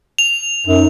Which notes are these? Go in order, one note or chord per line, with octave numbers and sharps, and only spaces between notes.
F7
F#2 D#4